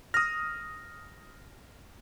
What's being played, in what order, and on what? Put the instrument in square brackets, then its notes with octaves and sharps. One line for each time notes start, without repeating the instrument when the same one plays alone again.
[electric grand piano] D#6 F6 [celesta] A#6